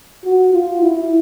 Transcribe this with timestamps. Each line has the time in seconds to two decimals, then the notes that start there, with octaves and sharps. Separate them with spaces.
0.25 F#4
0.53 F4
0.82 E4